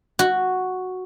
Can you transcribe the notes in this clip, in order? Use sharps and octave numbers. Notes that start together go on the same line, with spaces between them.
F#4